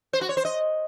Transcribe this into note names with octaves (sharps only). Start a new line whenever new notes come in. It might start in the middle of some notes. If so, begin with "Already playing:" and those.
C5
F#4
C#5
C5
D#5